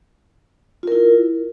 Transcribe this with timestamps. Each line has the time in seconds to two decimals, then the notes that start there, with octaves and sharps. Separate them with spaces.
0.83 F4
0.88 A#4
0.92 E4